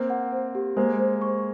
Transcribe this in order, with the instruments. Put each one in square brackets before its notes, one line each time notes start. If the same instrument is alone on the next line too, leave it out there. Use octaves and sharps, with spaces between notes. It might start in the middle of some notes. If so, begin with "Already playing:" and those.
Already playing: [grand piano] A#3 C4 [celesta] A#5
[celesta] F#5
C5
G4
[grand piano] G#3 A#3 [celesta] C5
[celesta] C5
C#6